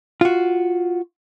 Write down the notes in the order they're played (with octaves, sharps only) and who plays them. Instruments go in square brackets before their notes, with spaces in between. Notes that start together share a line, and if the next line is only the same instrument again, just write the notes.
[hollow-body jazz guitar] F4 F#4